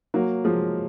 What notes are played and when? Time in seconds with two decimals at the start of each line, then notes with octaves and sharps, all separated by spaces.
0.14 F#3 A#3
0.44 F3 G#3